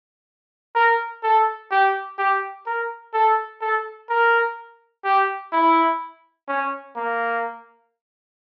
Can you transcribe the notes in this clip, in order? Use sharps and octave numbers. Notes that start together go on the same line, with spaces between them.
A#4
A4
G4
G4
A#4
A4
A4
A#4
G4
E4
C#4
A#3